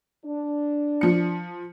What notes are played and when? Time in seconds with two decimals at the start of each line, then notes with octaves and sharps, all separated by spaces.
0.25 D4
1.01 F3 C#7